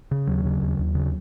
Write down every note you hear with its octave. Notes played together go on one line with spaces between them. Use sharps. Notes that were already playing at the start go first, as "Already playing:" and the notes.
C#3
D#2 F#3
C#3
D#2
D#2
C#3